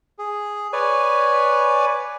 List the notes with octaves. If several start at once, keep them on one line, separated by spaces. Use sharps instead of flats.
G#4
B4 C#5 D5 G#5